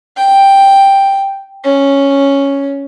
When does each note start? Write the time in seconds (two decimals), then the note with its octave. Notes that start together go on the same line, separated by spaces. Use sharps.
0.17 G5
1.65 C#4